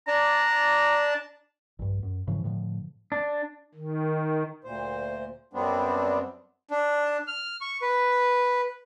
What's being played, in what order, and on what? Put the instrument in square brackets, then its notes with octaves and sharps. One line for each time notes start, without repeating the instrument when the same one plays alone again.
[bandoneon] D4 D5 A5 [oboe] A#5
[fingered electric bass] A#1 G2
F#2
G#2 C#3 E3 F3
A2 D3 F3
[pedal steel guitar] D4
[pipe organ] D#3
[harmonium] D2 A#2 C5
F#2 G3 B3 C4 D4
[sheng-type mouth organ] D4
F6
C#6
B4